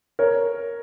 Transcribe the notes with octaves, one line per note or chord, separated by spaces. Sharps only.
A#4 C#5